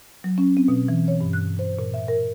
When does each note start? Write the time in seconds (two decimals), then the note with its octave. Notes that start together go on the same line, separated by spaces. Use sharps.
0.24 F#3
0.38 C#4
0.57 C4
0.68 B2
0.88 E3
1.08 C#5
1.21 G2
1.33 F#6
1.59 C5
1.79 A#2
1.94 E5
2.08 A#4